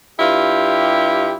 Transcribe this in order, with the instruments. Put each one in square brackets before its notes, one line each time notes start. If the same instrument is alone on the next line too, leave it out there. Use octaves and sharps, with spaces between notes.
[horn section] G2 E4 F4 G4